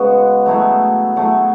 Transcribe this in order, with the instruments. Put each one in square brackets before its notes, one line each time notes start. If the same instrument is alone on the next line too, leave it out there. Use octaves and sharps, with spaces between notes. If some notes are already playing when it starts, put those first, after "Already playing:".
Already playing: [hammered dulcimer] C#3 G#3 B3 F#4
F#3 A3 E4 G#4
F#3 A3 E4 G#4